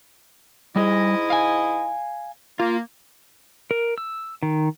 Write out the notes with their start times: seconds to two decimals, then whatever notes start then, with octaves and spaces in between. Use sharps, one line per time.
0.76 G#2 G3 E4 G#4 D#5
1.30 F5 G#5
2.60 A#3 F4
3.71 A#4
3.98 E6
4.43 D#3